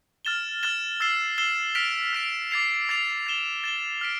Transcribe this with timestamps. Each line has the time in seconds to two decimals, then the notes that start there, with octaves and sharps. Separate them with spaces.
0.25 F6 A6 E7 G7
0.63 F6 A6 E7 G7
1.00 E6 A6 C7 E7 G7
1.38 E6 A6 C7 E7 G7
1.75 F6 B6 D7 F7
2.13 F6 B6 D7 F7
2.51 D6 A6 C7 F7
2.89 D6 A6 C7 F7
3.27 A6 E7 G7
3.64 A6 E7 G7
4.01 F6 B6 D7